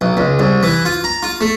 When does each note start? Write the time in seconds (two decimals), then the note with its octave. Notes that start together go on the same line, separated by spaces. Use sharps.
0.01 B1
0.17 C#2
0.39 C2
0.63 E3
0.85 F4
1.04 A#5
1.23 F4
1.41 A3